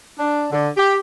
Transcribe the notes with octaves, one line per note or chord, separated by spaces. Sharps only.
D4
D3
G4